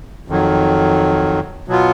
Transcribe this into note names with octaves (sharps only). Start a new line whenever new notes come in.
F2 D#3 F#3
B2 F#3 B3 F4